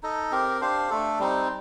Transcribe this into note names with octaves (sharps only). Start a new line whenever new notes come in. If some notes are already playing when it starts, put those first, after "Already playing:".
D#4 A4 D#5
C4 G4 A#4
D4 G4 C5 F5
A3 D4 A4
G3 C4 D#4